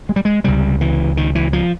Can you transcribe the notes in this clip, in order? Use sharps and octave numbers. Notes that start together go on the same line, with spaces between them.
G#3
G3
G#3
C#2 C3 G3
E3
D#3
E3
F3